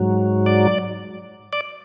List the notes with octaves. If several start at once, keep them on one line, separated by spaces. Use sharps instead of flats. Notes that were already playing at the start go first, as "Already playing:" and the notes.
Already playing: G#2 F#3
D5
D5